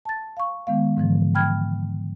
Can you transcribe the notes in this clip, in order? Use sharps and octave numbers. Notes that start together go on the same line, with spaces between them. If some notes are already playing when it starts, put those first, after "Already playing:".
A5 A6
F5 C#6
D#3 G#3 B3 F5
G#2 D3 E3 F3
G5 B5 F6 G#6